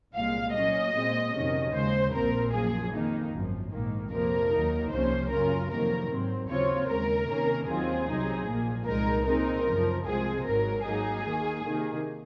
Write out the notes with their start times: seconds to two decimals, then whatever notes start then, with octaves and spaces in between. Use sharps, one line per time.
0.15 C2 A#2 G#3 F5
0.54 A#2 F#3 A#3 C#4 D#5
0.94 A#2 G#3 C4
1.34 F2 C3 D#3 F#3 C#4
1.73 D#2 C#3 G#3 C5
2.13 A#1 A#2 F3 C4 A#4
2.52 F#2 F3 A#3 G#4
2.92 F2 D#3 A#3 D#4
3.32 G#1 F#2 F3
3.71 A#1 G#2 D#3 A#3
4.12 F2 C3 F3 A#3 A#4
4.50 D#2 D#3 F#3 A#3 D#4
4.90 C2 C3 F3 A#3 C#4 C5
5.30 F#2 C#3 F#3 C#4 F4 A#4
5.70 F2 C3 D#3 F#3 A#3 A#4
6.09 G#2 F#3 C4
6.49 D#2 C#3 F#3 C4 F4 C#5
6.88 D#2 C#3 G#3 A#4
7.28 C3 D#3 A#3 C#4
7.67 D#2 D#3 F#3 C4 F4 G#4
8.07 C2 C3 F#3 C4 D#4
8.47 A#1 A#2 F3 A#3
8.87 C2 A#2 G#3 D#4 A#4
9.26 A#2 G#3 C4 D#4 A#4
9.66 F#2 C#3 F3
10.05 C2 C3 F3 G#3 C4 G#4
10.45 G#1 G#2 F#3 A#4
10.85 G#2 F#3 A#3 D#4 G#4
11.25 D#2 D#3 A#3
11.64 C3 D#3 A#3